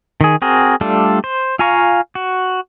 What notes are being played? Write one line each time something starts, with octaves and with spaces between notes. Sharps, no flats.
D#3 G#4
C4 F#4 G#4 A#4
G3 A3 D4 F4 A4
C5
F4 F5 G#5 A#5 C#6
F#4